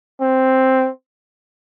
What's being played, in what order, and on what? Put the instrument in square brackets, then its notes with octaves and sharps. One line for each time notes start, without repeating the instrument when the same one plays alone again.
[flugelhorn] C4